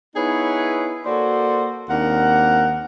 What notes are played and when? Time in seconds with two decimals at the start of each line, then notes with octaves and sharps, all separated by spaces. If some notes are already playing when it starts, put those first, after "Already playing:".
0.15 B3 D#4 E4 G#4 B4 C#5
1.06 A#3 F#4 A4 C5 D5
1.89 D#2 C4 D4 A#4 F#5